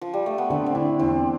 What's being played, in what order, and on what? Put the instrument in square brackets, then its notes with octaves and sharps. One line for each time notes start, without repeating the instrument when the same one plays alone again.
[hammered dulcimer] F3
G3
A3
B3
[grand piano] D3 [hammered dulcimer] C4
[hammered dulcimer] C4
[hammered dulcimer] D4 [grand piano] E4
[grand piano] E2 [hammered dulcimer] C4